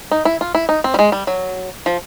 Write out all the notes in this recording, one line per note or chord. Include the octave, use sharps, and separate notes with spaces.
D#4
E4
F4
E4
D#4
C4
G3
G#3
G3
F#3
F3